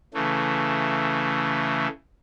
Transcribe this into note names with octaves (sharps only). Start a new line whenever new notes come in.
C#3 E3 A3